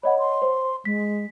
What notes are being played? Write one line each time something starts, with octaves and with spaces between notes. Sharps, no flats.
C#5 D#5 F#5 B5
C6
C5
G#3 B6